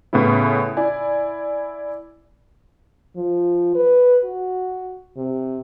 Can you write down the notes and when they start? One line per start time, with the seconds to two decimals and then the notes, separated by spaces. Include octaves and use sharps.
0.13 A2 C#3 B3 C#4 E4
0.77 E4 D5 G#5
3.16 F3
3.75 B4
4.24 F#4
5.17 C3